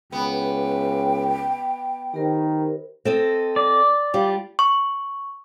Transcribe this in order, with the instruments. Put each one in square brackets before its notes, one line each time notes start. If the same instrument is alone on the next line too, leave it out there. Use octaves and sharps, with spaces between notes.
[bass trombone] C#2 [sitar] B3 [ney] G5
[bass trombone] D#3 [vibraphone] G4 A#4 C5
[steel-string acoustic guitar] C4 A4 D#5
[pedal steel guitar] D5
[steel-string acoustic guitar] G3 F4
[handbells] C#6